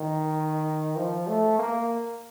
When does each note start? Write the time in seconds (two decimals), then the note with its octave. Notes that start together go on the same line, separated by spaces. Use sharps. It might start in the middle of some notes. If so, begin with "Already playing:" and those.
Already playing: D#3
0.97 F3
1.27 A3
1.59 A#3